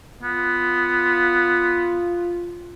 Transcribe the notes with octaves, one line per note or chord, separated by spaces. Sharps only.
B3 F4